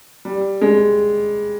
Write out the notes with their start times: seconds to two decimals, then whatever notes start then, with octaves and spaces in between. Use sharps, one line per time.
0.25 G3
0.61 G#3